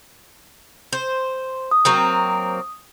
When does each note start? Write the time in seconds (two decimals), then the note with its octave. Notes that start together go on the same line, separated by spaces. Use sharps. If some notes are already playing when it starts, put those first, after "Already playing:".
0.93 C5
1.71 D#6
1.85 F#3 A#3 C4